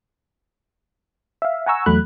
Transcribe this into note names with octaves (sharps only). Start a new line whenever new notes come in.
E5 F5
F#5 G#5 A#5 C#6 E6
E2 F#3 A3 B5 F#6